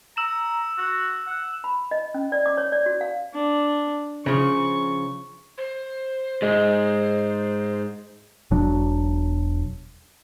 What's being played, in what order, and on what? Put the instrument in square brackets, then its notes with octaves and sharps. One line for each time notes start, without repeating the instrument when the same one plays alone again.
[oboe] A#5 [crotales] E6 E7
[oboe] F#4
F#5
[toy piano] B5
D#5
C#4
D5
D6
C#5
D5
F#4
F5
[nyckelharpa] D4
[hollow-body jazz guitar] C#3 F3 [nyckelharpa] C#6
[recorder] C5
[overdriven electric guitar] G#2 [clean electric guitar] G#4 D#5
[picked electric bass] E1 B2 F#3 D4